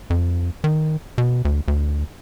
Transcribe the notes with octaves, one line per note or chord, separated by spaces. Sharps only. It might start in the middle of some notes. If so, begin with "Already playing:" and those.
F2
D#3
B2
D2
D2